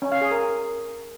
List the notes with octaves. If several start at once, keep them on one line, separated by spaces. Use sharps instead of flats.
C#4
F5
G#4
A#4